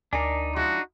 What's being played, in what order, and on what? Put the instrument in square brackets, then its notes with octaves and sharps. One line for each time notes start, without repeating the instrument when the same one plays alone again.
[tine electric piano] D2 [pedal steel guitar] D4 D#4 [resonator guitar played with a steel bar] A#4 D5 G#5
[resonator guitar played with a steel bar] F3 G#3 E4 [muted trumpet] F#4